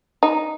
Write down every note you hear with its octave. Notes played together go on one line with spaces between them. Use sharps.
D#4